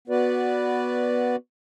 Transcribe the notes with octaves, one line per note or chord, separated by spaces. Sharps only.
B3 F#4 B4 D5